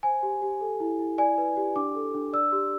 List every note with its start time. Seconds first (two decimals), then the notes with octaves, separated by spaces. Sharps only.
0.03 C5 G#5
0.23 G4
0.42 G4
0.61 A4
0.80 E4
0.99 E4
1.18 D5 G#5
1.38 B4
1.57 G4
1.76 D4 D6
1.95 A4
2.14 D4
2.33 D5 E6
2.52 G4